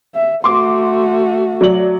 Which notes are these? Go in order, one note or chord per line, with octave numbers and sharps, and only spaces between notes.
E5
A3 F#4 C6 D6
F#3 D5 F#7